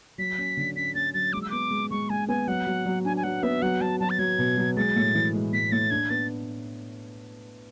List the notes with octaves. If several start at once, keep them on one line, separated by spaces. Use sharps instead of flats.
F#3 B6
C#4
D3
C#4 B6
C#4 A6
F#3 A6
G#3 D6
E6
B3 D6
G#3
G#3 C#6
G#3 G#5
B3 G#5
F#3 F#5
F#3
F#3
D4 G#5
G#5
F#3 F#5
B3 E5
F#3 F#5
F#3 A5
F#3 A5
A6
F#3 G#6
B2
F#3
G#3 A6
A2
E3
G#3
G#3 B6
A2 A6
D4 G#6
B3 A6